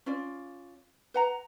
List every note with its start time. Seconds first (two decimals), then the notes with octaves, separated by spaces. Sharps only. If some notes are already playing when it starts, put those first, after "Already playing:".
0.06 C#4 F4 D5
1.14 B4 F#5 A#5